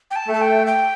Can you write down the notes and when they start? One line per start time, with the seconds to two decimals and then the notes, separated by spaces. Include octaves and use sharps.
0.11 G5
0.16 A5
0.29 A3 A5
0.41 G5
0.67 G5